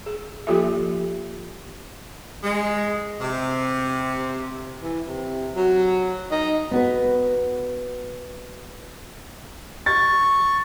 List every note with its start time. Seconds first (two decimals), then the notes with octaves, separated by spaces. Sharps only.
0.06 G#4
0.47 F3 A#3 F4 G4 A4 E5
2.43 G#3
3.21 C3
4.82 E3
5.07 C3
5.56 F#3
6.31 D#4
6.71 B3 F#4 B4
9.86 C#6 A6